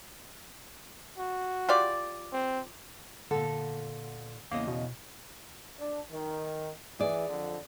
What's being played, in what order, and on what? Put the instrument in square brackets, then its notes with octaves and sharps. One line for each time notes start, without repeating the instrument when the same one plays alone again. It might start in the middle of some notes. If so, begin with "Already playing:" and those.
[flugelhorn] F#4
[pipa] F4 G4 D5
[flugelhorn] C4
[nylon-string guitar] A#2 A4 [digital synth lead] D3
[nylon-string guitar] E2 C#3 D#5 [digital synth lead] A#3
[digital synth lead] B2
[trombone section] D4
D#3
[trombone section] E3 [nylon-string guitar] G#4 D5
[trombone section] F2 D3 F3